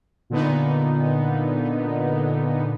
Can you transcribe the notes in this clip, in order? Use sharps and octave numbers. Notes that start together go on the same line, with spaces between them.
A#2 D3 B3 D#4